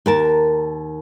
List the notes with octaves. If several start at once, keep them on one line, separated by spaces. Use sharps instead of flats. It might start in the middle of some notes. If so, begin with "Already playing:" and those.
D#2 A#4 A5